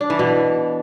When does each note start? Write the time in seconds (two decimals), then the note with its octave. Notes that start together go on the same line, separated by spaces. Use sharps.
0.01 D4
0.10 E3
0.19 B2